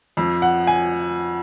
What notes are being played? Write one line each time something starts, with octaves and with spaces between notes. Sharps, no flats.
F2 F3
F#5
G#5